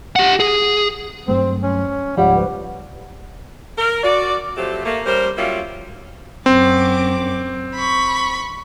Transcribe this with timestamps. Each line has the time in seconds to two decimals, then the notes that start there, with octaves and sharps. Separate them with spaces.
0.16 G4 F#5
0.40 G#4
1.28 G2 F#3 A3 C4
1.63 C#4
2.17 C#2 G#2 F3 G3 C#5 F5 F#5
2.36 B4 C5
3.78 A#4
4.03 F#4 D5
4.57 F3 F#3 A3 C4 G4
4.85 A3 A#3
5.06 G3 C#4 A#4 C5
5.37 F#3 G3 A#3 C#4 F4 E5
6.46 F#2 C4 D6
7.75 B5 C#6